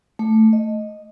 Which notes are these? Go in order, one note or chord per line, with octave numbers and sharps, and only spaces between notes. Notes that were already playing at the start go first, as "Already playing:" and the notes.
A3
D#5